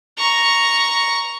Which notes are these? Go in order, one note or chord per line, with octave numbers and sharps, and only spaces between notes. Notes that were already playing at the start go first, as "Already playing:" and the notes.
A#5 C#6